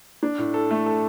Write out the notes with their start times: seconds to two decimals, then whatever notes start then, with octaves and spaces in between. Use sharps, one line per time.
0.23 D4
0.38 A2
0.54 A4
0.70 A3
0.86 A4